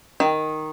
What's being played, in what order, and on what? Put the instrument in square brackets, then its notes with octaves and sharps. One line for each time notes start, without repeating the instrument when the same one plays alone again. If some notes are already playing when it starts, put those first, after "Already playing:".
[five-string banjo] D#3